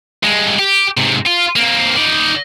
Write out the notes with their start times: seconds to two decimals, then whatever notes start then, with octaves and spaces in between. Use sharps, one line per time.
0.23 G2 G#3
0.59 G4
0.97 G#2 C3
1.27 F4
1.56 A#3 C4
1.96 D#4 D5